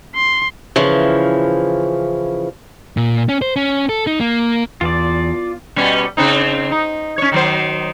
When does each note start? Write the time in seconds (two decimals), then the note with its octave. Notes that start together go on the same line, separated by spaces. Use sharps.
0.15 C6
0.76 C#3 E3 F3
2.97 A#2
3.29 C#4
3.42 C5
3.56 C#4
3.89 A4
4.07 D#4
4.20 A#3
4.81 E2 F4 D5
5.76 B2 G3 C#4
6.17 C#3 C4 D#4
6.71 D#4
7.18 C#4 C#5
7.32 D#3 F#3 C5